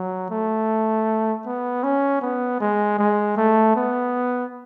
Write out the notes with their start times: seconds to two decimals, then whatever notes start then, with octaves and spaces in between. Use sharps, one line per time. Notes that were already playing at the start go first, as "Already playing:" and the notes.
Already playing: F#3
0.31 A3
1.46 B3
1.83 C#4
2.22 B3
2.61 G#3
2.99 G#3
3.37 A3
3.76 B3